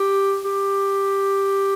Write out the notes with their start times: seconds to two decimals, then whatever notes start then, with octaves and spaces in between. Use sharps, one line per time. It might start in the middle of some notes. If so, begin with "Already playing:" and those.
Already playing: G4
0.45 G4